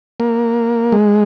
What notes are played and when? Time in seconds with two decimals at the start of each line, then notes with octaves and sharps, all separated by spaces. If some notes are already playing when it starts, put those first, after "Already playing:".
0.20 A#3
0.92 G#3